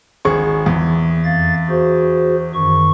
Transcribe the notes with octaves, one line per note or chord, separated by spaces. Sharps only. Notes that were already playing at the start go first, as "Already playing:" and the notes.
G#1 G#4 C#6
E2
F2 F5 A6
F#4 G#4 C5
F#2 D#3 C#6